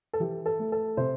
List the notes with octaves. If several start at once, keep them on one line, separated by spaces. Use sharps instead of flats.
A4
E3 G4
A4
A3
A4
C3 C5